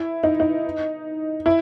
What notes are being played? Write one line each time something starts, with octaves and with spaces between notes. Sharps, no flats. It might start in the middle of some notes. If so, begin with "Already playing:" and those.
Already playing: E4
D#4
D#4
E4